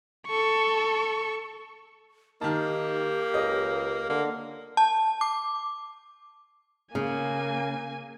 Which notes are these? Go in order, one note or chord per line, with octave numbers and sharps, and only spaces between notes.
A4 C#6
D#3 A#3 D#4 G4 A5
C#2 D#5
D3 A#3
A5
D6
C#3 A#3 G#5